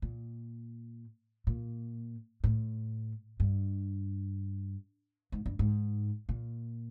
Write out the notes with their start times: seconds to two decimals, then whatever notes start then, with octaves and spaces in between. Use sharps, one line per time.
0.02 A#2
1.47 A#2
2.44 A2
3.40 G2
5.32 G#2
5.46 G2
5.59 G#2
6.29 A#2